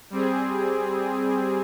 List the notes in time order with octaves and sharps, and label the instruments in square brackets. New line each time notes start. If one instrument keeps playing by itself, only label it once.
[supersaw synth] G3 C4 G#4